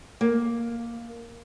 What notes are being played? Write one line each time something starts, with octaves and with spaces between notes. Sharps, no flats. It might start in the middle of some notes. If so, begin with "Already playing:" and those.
A#3